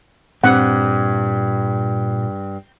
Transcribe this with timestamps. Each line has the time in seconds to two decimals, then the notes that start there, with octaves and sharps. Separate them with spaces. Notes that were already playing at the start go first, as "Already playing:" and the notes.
0.44 G2 A#2 C4 F#5